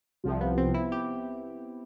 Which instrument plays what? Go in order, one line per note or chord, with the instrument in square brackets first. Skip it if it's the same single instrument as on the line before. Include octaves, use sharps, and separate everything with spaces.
[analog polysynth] C2 C3 F3
[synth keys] B3
C4
E4
G4